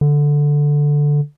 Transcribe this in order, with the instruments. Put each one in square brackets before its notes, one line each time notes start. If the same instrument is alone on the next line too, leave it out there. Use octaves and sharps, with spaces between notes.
[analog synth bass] D3